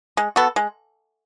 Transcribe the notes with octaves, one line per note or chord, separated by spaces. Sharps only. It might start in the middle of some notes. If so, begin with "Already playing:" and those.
G#3
B3 F#4 A4
G#3